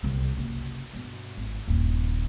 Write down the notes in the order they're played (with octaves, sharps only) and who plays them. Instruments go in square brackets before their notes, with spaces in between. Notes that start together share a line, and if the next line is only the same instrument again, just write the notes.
[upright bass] C2 C4
F#1 C2
G2 B2
G#1
D#1 G2